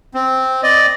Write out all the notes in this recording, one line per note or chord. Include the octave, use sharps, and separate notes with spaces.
C4
D5 D#5